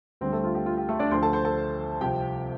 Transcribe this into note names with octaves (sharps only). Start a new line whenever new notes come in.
D2 D3 G3 C4 C5
A3 A4
F4
G4
F4
G4
A3 A4
D4 D5
D2 D3 F3 C5 C6
A4 A5
C5 C6
A4 A5
C2 C3 F3 G4 G5